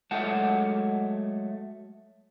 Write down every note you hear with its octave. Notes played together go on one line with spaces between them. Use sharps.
F#3 G#3 A3 F#5 A5